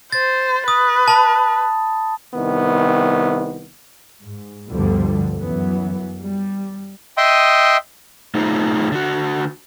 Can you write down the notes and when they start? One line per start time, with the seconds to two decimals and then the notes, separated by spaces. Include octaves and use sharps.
0.12 C5 A6
0.68 B4 D#6
1.08 A5 B5
2.33 C2 D#3 B3
4.21 G#2
4.70 D2 G2 B2 D3 F3 G3
5.37 F#2 E3 F#3 B3
6.23 G3
7.17 D#5 E5 G5 C6 D#6
8.35 A3 D#4 F4 G#4 C5
8.92 D3 F#4